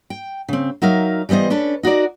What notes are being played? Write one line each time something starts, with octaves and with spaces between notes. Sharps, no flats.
G5
C#3 C4
F#3 D#4 A#4 E5 F5
E3 G3 B3 C5 D#5
C#4 D4 A4 B4
D#4 F#4 A#4 D5